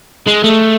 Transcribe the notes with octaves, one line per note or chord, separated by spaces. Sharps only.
G#3
A3